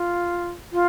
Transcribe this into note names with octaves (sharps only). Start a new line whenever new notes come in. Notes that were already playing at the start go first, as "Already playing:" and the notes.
Already playing: F4
F4